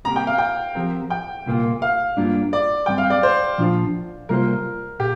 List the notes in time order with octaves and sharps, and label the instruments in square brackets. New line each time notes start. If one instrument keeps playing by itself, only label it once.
[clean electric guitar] C2 C3 A#3 G4 [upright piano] A#5
[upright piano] G5
F5
G5
[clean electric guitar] F3 C4 G4 A#4
[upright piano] G5
[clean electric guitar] C2 A#2 A#3 F4 A#4
[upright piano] F5
[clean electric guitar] G2 G3 A#3 D4 F4
[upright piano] D5
[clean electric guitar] G2 G3 C4 [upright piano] G5
[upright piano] F5
D5
C5
[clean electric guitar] A#2 F3 D4 F4
[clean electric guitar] C3 G3 A#3 F4 C5 [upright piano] A#4
[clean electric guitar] A#2 [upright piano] G4